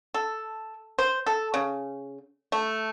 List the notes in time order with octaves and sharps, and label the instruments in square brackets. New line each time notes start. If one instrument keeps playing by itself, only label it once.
[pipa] A4
C5
A4
C#3
A3